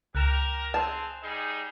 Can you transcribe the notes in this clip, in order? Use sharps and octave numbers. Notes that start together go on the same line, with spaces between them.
C#2 G4 A#4 F#6 E7 F7
C4 G#4 C5 A5
G3 D#4 G#4